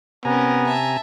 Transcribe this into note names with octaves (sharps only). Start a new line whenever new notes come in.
C3 B3 C#4 A#4 G#5 A#5
E5 A5